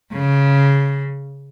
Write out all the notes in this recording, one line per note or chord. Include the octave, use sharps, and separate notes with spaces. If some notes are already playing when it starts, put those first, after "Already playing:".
C#3